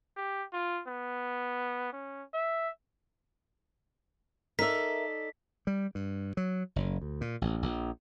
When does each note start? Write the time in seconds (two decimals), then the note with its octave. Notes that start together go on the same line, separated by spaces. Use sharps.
0.16 G4
0.53 F4
0.88 B3
1.93 C#4
2.34 E5
4.59 D#4 A4 A#4 D5 E5 B6
5.67 G3
5.95 G2
6.37 F#3
6.76 F#1
7.01 D2
7.21 A#2
7.41 A1
7.62 A#1